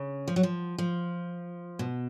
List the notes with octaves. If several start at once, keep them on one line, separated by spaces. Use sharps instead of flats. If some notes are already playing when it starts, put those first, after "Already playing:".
Already playing: C#3
F3
F#3
F3
F3
B2